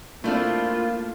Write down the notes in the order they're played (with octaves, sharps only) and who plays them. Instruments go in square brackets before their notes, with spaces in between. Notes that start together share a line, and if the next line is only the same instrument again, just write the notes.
[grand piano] A3 [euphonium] A#3 [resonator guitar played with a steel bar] C4 D4 E4 [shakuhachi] F4